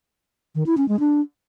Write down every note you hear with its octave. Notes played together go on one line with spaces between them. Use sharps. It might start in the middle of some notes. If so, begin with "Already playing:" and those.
D#3
E4
C#4
G#3
D4